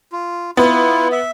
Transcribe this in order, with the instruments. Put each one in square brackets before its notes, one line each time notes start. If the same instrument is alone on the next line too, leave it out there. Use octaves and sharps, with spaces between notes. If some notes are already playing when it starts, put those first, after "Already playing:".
[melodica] F4
[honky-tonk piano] B3 [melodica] E4 F4
[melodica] E5